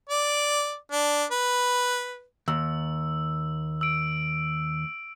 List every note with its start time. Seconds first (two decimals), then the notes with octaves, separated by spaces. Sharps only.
0.09 D5
0.92 D4
1.31 B4
2.48 D#2 E6
3.81 E6 D7